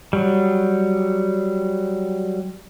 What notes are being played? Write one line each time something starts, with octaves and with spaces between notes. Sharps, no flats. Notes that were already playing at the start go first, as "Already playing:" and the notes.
F#3 G3